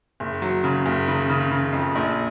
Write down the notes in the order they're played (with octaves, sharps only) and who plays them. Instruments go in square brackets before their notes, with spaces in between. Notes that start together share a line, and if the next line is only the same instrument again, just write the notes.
[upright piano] F#1
F#3
C#3
F#1
C#3
C#3
C#3
F2
A#1